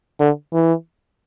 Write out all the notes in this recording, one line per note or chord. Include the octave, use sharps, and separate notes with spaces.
D3
E3